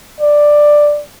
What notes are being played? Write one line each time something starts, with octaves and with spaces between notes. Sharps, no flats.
D5